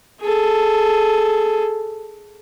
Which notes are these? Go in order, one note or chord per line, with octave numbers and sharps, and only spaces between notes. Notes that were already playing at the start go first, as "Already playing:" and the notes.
G#4 A4